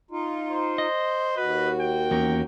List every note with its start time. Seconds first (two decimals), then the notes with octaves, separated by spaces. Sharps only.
0.11 D#4 F4
0.50 C5
0.78 D#5
1.37 D#2 F#4 B4
1.80 G5
2.11 E2 A#3 C#4